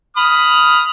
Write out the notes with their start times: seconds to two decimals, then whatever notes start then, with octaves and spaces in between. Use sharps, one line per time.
0.17 B5 D#6 F6